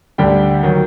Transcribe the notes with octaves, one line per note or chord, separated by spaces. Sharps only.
D2 D3 G3 G5
D#3 F#3